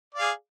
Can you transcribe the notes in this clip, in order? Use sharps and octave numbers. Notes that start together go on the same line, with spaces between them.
G#4 D5 F5